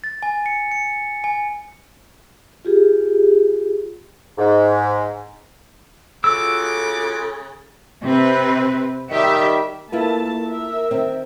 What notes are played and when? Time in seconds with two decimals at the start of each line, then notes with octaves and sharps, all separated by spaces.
0.04 A6
0.23 G#5
0.46 C#7
0.71 C#7
1.24 G#5
2.65 F4 G4 G#4
4.38 G#2
6.24 C#3 F4 F#4 A4 D6 E6
8.03 C3 C4 B4
9.11 D#3 G3 G4 E5
9.92 A3 A#3 E4 F4 B4 A5
10.43 A#4 E5
10.91 D#3 C4